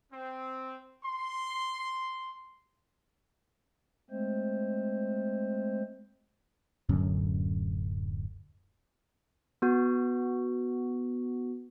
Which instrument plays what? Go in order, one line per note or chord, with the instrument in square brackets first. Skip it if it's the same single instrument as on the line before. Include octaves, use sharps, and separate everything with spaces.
[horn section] C4
C6
[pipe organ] G#3 A3 C4 C5
[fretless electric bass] D1 F#2 D3 C#4
[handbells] B3 F#4